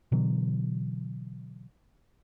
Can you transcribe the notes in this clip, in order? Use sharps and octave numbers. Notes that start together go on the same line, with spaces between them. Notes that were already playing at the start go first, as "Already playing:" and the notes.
B2 D3 E3 F#3